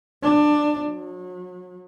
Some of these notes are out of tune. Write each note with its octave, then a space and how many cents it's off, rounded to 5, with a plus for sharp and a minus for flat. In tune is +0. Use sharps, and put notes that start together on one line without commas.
D4 +20
F#3 -35